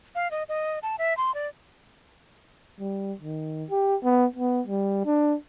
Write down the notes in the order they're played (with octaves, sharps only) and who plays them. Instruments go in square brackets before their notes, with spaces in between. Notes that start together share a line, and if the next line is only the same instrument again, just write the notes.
[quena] F5
D#5
D#5
A5
E5
C6
D5
[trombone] G3
D#3
G4
B3
B3
G3
D4